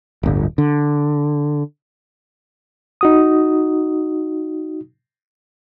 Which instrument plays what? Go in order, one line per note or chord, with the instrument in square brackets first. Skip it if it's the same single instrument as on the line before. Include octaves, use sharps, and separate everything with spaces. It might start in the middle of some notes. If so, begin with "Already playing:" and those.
[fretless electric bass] D1 G1
D3
[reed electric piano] D#4 F#4 D#6